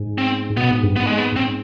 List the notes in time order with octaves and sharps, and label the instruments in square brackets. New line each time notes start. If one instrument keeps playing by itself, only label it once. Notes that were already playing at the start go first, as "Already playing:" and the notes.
Already playing: [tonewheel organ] G#2
[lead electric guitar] C4
[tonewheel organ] B2 [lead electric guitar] B3
[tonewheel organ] G#2
G2
[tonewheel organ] G#2 [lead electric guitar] B3
[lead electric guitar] G#3
B3
[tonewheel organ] G#2 [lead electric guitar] C4